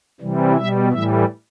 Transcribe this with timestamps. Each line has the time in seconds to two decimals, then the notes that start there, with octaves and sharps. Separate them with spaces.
0.21 C3 E3 G3
0.57 B2 G3 E5
0.92 A2 E3 G3 E5